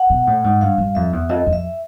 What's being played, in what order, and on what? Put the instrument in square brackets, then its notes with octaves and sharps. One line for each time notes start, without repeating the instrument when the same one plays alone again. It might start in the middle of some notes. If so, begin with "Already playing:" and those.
Already playing: [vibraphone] F#5
[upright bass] B2
A2
G#2
[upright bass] G2 [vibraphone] F5
[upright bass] G2
[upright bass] F2 [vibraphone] E5
[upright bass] E2
[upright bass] F2 [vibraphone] D#5
[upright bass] F2
[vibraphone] E5